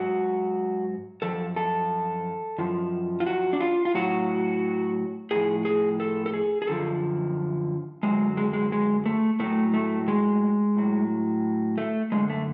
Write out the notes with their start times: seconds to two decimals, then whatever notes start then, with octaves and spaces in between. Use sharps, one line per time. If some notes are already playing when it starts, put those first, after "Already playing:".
Already playing: G#2 F#3 F#4
1.22 F#2 F3 A4
1.56 A4
2.58 F#2 F3
3.20 F4
3.26 F#4
3.53 D4
3.60 F4
3.85 F4
3.94 A2 F#3 F#4
5.31 A2 F3 G#4
5.65 G#4
6.00 A4
6.26 A4
6.34 G#4
6.62 G#4
6.67 F#2 D3 F3 A4
8.03 F#2 D3 F#3 G#3
8.37 G#3
8.53 G#3
8.72 G#3
9.06 A3
9.40 A2 F#3 A3
9.74 A3
10.08 G#3
10.76 A2 F#3
11.78 A3
12.12 F#2 D3 G#3
12.30 A3